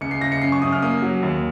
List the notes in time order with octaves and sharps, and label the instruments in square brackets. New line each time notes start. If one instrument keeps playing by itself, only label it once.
[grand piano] C#2 C#7
C7
C#2 A#6
C#7
F#2 C7
C#6
F#2 D#6
F6
A#3 D#6
F#3
D#2